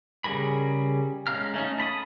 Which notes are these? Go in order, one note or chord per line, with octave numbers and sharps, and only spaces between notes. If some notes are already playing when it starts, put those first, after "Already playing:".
C#3 G3 G#4 A#4 B5
G#3 C#4 F5 A#5 F6
A3 C#4 D#4
A5 B5 C6 D#6